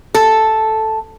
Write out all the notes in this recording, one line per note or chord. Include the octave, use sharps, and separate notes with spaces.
A4